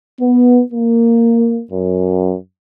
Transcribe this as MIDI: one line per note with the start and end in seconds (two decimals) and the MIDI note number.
0.20 0.61 59
0.72 1.61 58
1.71 2.35 42